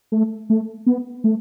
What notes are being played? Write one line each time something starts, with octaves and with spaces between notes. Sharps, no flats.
A3
A3
B3
A3